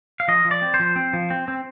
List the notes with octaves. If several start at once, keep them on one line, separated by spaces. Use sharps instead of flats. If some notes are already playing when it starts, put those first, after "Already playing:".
F5
F3 D#5
F3
D5
C4
C5
F3
C4
F3
C4
C4